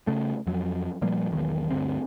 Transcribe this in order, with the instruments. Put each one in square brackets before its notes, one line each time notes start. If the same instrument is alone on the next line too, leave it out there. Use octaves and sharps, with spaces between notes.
[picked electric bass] C#3 A3
F2 F#3
A#2 F3 G3 A#3
E1 B1 D#3
D2 G2 D3 C4